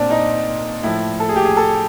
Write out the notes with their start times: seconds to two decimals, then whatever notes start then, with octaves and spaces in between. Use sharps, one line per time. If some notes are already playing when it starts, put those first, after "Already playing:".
Already playing: A#2 C4 D4
0.10 D#4
0.83 A2 F3 E4
1.20 A4
1.29 G#4
1.36 G4
1.45 G#4
1.57 A4